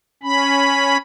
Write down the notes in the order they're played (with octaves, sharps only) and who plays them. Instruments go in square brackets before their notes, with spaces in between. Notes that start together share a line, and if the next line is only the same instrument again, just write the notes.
[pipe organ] C#4 B5